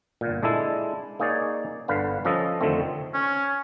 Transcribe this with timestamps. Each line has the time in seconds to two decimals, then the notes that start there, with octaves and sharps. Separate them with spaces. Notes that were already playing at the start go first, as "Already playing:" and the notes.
0.21 G1 A#2
0.43 G#3 D4 E4 A4
1.19 A#3 D#4 G#4 C#5 D5
1.88 G1 D3 B4 F5
2.25 F3 C#4 A4 D#5
2.61 F2 D3 D#3 A3 C4
3.14 C#4